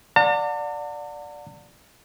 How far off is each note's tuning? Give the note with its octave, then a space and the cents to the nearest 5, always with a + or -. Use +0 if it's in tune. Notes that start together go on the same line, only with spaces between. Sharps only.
D5 +0 F#5 -40 A5 +45